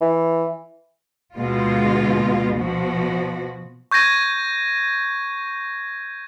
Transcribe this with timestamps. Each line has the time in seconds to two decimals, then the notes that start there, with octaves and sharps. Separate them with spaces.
0.01 E3
1.35 D2 B2 G#3 F4
2.57 B2 F3 F#4
3.91 C#6 G6 G#6 A#6 D#7